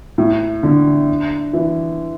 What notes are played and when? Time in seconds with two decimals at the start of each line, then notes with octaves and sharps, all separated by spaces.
0.18 A2
0.63 D3
1.53 E3